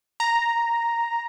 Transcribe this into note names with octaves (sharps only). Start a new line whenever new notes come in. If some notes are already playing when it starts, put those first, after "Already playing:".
A#5